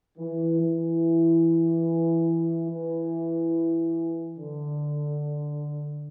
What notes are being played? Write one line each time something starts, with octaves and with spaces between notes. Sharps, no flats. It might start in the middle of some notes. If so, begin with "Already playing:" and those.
E3
E3
E3
D3